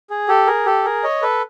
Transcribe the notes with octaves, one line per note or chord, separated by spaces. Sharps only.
G#4
G4 A4
G#4 A#4
G4 A4
G#4 A#4
C#5 D#5
A4 B4